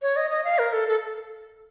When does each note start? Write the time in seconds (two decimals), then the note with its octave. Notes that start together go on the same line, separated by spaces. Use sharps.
0.02 C#5
0.16 D#5
0.31 D#5
0.44 F5
0.59 A#4
0.73 A4
0.88 A4